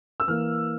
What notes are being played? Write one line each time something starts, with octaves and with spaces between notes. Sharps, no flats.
E6
E3 A#3 F6